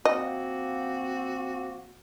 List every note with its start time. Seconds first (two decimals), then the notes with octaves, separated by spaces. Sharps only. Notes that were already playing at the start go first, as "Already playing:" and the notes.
0.05 F3 A#3 C4 F#4 D#5